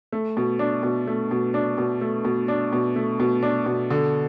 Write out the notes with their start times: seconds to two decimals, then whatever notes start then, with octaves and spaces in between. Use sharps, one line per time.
0.12 A3
0.37 B2
0.59 D4
0.83 B2
1.07 A3
1.31 B2
1.54 D4
1.78 B2
2.01 A3
2.25 B2
2.48 D4
2.73 B2
2.96 A3
3.20 B2
3.43 D4
3.66 B2
3.90 D3